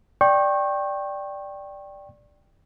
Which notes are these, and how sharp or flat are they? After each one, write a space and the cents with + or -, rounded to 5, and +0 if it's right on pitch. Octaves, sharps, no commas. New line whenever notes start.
D5 +0 G5 +0 C#6 -30